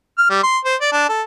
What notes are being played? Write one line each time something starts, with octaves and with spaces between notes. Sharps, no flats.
F6
G3
C6
C5
D5
D4
A4